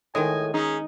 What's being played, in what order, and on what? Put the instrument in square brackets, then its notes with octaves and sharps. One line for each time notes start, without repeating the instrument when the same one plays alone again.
[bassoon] A2 [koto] D#3 G#3 [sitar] D#5 [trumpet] G#5
[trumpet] C#4 [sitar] D#4 [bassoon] G#4